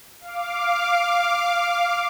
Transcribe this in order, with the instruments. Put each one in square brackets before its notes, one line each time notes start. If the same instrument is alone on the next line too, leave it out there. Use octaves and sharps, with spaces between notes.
[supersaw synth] F5 D6